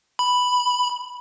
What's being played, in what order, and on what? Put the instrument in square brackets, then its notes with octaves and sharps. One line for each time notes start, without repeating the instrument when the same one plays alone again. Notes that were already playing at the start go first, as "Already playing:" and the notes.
[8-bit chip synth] B5